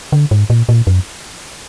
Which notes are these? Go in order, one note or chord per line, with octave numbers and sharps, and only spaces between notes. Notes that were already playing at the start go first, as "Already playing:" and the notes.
D3
G#2
A#2
A#2
F#2